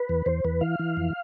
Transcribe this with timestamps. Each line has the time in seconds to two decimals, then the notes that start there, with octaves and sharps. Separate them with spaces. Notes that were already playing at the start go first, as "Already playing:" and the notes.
Already playing: B4
0.09 E2
0.26 E2 C5
0.45 E2 B4
0.61 E3 F5
0.79 E3
0.97 F2